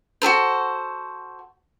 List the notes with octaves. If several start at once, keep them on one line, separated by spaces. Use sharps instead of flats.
F#4 G#4 A4 C5